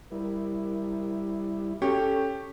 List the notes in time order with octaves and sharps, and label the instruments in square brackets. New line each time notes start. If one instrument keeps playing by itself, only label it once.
[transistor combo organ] G3 E4 [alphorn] A#4
[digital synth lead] C#4 [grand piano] G4 [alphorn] A4